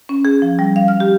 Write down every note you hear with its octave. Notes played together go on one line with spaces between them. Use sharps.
C#4
G#4
F3
G3
F5
F6
G4